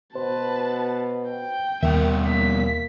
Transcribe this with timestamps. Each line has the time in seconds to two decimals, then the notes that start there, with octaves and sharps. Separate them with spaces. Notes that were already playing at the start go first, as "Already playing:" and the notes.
0.16 B2 B4 C5 A5
1.29 G5
1.83 D#2 B2 G3 A#4 E5
2.27 A#3 B6